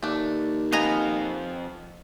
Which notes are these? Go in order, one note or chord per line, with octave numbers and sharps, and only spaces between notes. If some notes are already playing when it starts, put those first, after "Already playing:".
D#2 A3 D4
F2 B3 D#5 F5 G#5 A#5